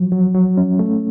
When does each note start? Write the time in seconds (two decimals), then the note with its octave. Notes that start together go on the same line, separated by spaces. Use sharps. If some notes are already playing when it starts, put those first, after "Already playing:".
Already playing: F3 F#3
0.12 F#3
0.34 F#3
0.57 C#4
0.79 A3